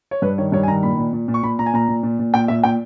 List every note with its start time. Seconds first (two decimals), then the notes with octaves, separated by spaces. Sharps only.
0.11 C#5
0.22 G2 B4
0.38 D#3 C#5
0.52 G2 C#5
0.63 G#5
0.68 D#3 A#5
0.83 A#2 B5
0.98 A#2
1.13 A#2
1.28 A#2
1.34 C#6
1.43 A#2 B5
1.59 A#2 A#5
1.66 G#5
1.74 A#2 A#5
1.88 A#2
2.03 A#2
2.19 A#2
2.34 A#2 G5
2.48 A#2 E5
2.64 A#2 G5